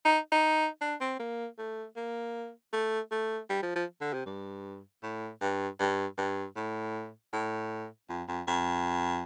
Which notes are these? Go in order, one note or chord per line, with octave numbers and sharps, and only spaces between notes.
D#4
D#4
D4
C4
A#3
A3
A#3
A3
A3
G3
F3
F3
D3
C3
G2
A2
G2
G2
G2
A2
A2
F2
F2
F2